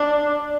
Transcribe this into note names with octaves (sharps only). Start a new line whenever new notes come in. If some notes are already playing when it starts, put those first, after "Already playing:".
Already playing: D4